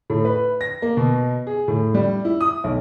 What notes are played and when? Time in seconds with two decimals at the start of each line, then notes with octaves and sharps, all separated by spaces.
0.10 A2
0.25 B4
0.61 A#6
0.82 A#3
0.97 B2
1.47 G#4
1.68 A2
1.94 G3
2.25 E4
2.41 D#6
2.64 B1